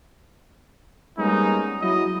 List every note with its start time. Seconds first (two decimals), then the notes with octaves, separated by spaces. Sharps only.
1.19 G3 G#3 A#3 B3 C#4 D#4
1.82 F#3 E4 D#5